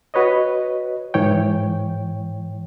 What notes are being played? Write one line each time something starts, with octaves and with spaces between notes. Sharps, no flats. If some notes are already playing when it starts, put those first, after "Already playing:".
F#4 B4 C#5 D#5
G#2 E3 C#5 G5